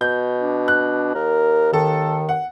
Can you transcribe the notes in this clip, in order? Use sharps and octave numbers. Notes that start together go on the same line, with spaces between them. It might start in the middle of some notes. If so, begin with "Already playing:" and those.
B2 G6
D4
F#6
D#2 A#4
D#3 A4
F#5